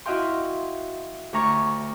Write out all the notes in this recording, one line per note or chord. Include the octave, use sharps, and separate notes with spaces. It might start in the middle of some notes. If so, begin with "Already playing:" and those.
E4 F#4 D#5 F5 G5 C6
D2 C#5 A#5 C#6